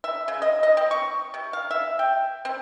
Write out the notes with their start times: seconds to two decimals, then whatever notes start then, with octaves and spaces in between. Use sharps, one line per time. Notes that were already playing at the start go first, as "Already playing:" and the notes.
0.04 E5
0.28 C#3
0.42 D#5
0.63 D#5
0.77 C4
0.91 C#6
1.34 C3
1.53 F5
1.71 E5
1.99 G5
2.45 C4